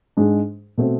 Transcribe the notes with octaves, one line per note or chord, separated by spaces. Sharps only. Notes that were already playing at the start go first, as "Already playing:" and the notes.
G#2 G#3 D4
B2 A3 C4